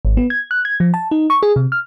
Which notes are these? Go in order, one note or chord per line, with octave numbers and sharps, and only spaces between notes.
G#1
B3
G#6
F#6
G#6
F3
A5
D#4
C#6
G#4
C3
F6